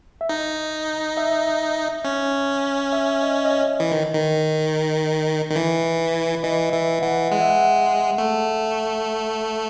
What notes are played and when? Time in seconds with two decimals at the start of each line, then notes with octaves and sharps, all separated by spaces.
0.21 E5
0.29 D#4 D#5
1.17 E5
2.05 C#4
2.93 E5
3.22 D#5
3.45 D#5
3.51 C#5
3.80 E3 D#5
3.91 D#3
4.14 D#3
5.51 D#3
5.55 E3
6.43 E3 D#5
6.72 E3 E5
7.02 E3 F#5
7.31 G#3 F#5
7.41 E5
7.50 F#5
8.18 A3